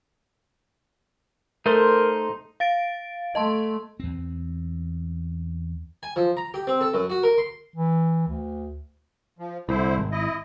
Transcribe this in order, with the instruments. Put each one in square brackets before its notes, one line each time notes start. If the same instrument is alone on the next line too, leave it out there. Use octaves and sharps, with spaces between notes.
[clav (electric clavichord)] A3 [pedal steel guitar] D#4 C5 C6 [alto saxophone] A#4
[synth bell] F5 A6 D7
[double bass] A3 [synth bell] D#5 A5 C6
[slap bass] E2 C4
[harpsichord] G#5
F3
A#5
G4
C4
A4
F#2
F#4
A#4
C6
[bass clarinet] E3
D2
[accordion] F3
[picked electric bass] C2 [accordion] D3 E4 C5
[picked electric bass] G#1
[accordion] E4 D#5